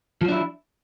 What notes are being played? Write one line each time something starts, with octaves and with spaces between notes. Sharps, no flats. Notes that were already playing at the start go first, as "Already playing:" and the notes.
F3 F#3 D4 E4